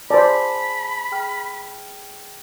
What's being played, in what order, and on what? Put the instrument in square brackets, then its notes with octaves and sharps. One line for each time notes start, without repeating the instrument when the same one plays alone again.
[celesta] G#4 G#5 A5 [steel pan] C5 D5 [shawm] B5
[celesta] G#4 G5 F6